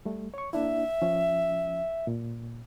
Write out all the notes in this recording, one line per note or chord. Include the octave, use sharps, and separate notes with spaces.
G3 A3
C#5 C#6
A#3 D4 E4 E5
F3 C#4
A#2